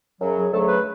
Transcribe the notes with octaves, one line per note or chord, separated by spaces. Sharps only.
F#2 C#3 F#3
G#4
D2 C#3 F#3 A3 A4
B4